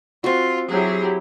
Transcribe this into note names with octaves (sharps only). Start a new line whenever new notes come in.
C4 F4 F#4
F#3 E4 G4 G#4